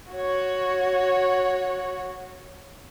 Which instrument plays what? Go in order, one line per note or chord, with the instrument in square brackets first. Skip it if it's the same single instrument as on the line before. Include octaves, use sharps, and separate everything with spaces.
[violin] F#4 C#5